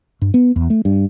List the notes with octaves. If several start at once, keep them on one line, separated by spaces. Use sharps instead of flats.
G2
B3
E2
A3
G2